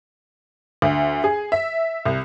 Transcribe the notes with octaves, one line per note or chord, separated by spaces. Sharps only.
D2
G#4
E5
C2